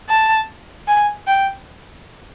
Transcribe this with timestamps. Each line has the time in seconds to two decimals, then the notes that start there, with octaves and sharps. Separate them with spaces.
0.09 A5
0.88 G#5
1.27 G5